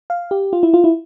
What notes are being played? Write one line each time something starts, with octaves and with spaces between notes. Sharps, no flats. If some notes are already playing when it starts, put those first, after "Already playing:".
F5
G4
F4
E4
F4
E4